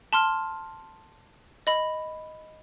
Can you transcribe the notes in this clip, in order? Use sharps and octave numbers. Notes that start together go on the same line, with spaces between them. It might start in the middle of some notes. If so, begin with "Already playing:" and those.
A5 C6 F6
D#5 B5